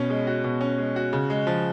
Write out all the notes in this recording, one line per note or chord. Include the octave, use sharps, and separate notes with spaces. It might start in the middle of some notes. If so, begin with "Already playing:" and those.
Already playing: B2 C#4
G#3
F#4
B2
C#4
G#3
F#4
C#3
G#3
F3